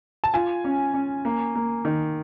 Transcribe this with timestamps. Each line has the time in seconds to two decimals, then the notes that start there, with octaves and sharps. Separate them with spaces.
0.24 A5
0.34 F4 G#5
0.64 C#4
0.94 C#4
1.25 A#3
1.55 A#3
1.85 D#3